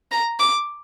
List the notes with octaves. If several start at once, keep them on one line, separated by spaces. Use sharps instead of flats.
A#5
D6